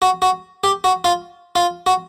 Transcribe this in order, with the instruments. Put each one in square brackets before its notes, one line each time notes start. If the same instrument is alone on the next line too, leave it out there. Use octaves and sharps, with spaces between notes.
[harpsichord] F#4
F#4
G4
F#4
F4
F4
F#4